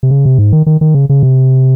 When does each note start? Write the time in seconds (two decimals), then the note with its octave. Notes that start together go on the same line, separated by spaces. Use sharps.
0.03 C3
0.11 C#3
0.25 C3
0.39 G#2
0.52 D#3
0.66 D#3
0.81 D#3
0.95 C#3
1.09 C#3
1.23 C3